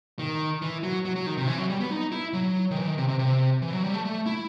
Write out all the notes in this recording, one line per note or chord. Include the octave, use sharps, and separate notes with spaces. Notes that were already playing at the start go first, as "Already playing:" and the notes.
D#3
E3
F#3
F#3
F#3
D#3
C3
E3
F#3
G3
B3
D#4
E4
F#3
D#3
E3
D#3
C3
C3
C3
E3
F#3
G3
A3
A3
E4